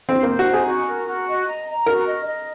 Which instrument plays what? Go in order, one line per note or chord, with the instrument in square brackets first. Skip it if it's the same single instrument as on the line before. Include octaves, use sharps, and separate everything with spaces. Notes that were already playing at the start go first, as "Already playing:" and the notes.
[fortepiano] C4 [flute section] C5
[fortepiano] A#3
[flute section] C5
[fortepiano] F#4
[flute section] D#4
[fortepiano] G#4
[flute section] F#4
A#4
F#4
D#5
A#5
A#5
[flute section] F#4 [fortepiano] A#4
[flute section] D#5
D#5